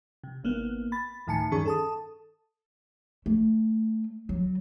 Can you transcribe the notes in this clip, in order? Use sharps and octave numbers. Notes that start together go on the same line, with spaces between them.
C3
G#1 A#3 B3
B5 A6
D2 A2 D#3 G#5 A5 C#7
G2 D#3 C#4 G#4 C#6
A4 A5 D#6
A3
F#3